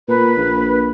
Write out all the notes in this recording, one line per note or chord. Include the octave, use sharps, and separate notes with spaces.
A#2 B4
A#1